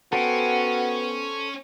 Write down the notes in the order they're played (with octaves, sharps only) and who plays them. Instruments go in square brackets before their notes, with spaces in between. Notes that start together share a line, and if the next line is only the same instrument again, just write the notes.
[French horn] B3 [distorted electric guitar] C#4 [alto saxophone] F#4 [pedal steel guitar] A4 C5 G5